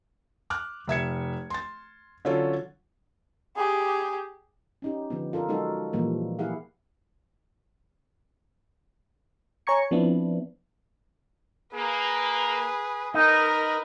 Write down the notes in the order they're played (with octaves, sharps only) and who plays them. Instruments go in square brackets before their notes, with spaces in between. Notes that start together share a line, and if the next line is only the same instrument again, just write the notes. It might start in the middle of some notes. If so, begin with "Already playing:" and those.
[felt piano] D6 F6 F#6
F1 E5 G#6 C#7
C6 A6
D3 F#3 C#4 F4 A4
[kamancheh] G4 G#4
[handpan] C#4 D#4 G4
D3 F3 B3
F4 A4 A#4 D5
F#3 G#3 D#4 F#4 A4 A#4
A#2 E3 F3 G3 A#3
E4 G4 G#4 F5 F#5
[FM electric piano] C#5 G#5 A#5 C#6 G#6 C#7
F3 B3 C4 D4 E4
[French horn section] A#3 [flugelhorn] G#4 [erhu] B4
[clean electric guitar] D#4 [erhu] A#4 [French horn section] B4 D#5